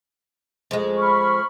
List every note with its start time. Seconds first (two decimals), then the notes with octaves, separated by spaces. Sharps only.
0.71 F2 G#3
0.97 B5 C#6 F6